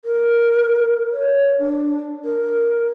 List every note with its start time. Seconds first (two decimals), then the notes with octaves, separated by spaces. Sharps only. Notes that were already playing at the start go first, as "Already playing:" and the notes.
0.05 A#4
1.12 C#5
1.59 D4
2.25 A#4